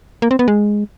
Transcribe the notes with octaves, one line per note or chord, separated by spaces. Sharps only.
A#3
C4
B3
G#3